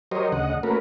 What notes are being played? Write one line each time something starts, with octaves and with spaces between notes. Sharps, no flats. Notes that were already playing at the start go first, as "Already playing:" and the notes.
F#3 G4 A#4 C5 C#5 D#5
D2 C#3 D#5 F#5
A3 A#3 C#4 F#4 A#4 B4